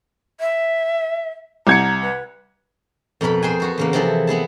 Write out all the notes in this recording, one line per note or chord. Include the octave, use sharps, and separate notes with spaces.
E5
C2 A#5 G#6 C#7
B4
F2 B2 A#4 B4 B5
G#4 C5 G5 G#5
B3 F#4 A4
E2 C#3 A#3
C3 E3 F3 E4 G#4 A4
B3 E4 G#4 A5